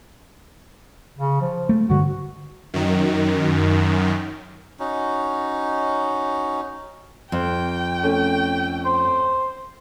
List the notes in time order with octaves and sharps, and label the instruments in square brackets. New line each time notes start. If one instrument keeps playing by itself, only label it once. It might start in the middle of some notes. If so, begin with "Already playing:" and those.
[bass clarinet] C#3
F3
[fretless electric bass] A3
[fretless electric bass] G2 D3 [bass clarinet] F#4
[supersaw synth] F#2 D#3
[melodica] C#4 D#4 F#4
[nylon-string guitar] F2 [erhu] G5
[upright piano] A3 C#4
[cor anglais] C5